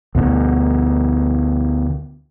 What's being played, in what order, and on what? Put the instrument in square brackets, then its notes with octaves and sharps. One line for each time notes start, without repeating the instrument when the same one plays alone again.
[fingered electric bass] D2 B2